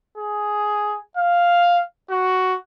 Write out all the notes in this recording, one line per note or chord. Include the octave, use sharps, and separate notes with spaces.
G#4
F5
F#4